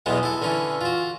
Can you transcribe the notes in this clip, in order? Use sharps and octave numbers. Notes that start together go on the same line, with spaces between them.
B1 E2 B2 E3 G#3 B3
E4 A4
D3 E3 C#4 E4
F4 F#4